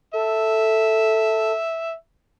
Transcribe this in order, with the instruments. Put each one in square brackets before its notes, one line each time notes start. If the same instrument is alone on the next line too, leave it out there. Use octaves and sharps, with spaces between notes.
[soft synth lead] A4 [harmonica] E5